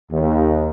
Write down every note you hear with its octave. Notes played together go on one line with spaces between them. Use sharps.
D#2